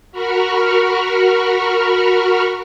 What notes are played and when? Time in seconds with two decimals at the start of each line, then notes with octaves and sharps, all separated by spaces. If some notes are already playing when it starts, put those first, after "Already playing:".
0.12 F#4 A#4 B5 C#6 F6